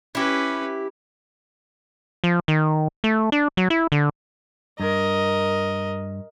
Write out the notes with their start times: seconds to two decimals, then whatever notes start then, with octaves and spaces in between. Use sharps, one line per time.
0.15 C#4 E4 G4 B4
2.24 F3
2.48 D#3
3.04 A3
3.32 D4
3.57 F#3
3.70 E4
3.92 D3
4.80 G2 A#4 D#5